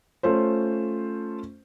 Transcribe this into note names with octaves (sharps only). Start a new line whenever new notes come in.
A3 C#4 F4 C5